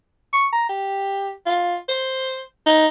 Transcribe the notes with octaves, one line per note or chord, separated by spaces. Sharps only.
C#6
A#5
G4
F4
C5
D#4